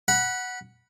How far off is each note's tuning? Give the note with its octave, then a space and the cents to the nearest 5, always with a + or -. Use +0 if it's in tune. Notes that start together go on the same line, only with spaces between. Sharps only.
F#5 +0 B5 -20